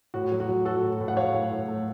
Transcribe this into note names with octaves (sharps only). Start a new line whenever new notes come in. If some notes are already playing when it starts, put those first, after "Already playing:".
A2 F#4
F#3
F#4
F#3
F#3 F#4 A4
A2
A2
F#5
F#3 C#5 F5
A2
A2
A3